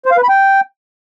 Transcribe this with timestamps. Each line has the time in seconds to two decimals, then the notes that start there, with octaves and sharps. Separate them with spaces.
0.06 C5
0.12 F5
0.17 B4
0.23 B5
0.29 G5